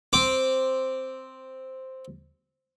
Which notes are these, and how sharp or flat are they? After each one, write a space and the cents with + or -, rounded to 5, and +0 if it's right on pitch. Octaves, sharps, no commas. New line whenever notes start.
C4 +0 D6 -5